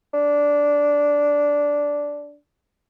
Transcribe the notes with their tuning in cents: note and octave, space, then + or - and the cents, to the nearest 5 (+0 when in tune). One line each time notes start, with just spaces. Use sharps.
D4 -10